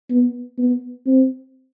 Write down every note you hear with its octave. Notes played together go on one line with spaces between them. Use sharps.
B3
B3
C4